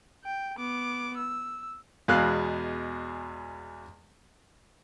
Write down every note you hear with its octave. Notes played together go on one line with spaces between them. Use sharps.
G5
B3 D6
E6
E2 B2 G#3 F5 F#6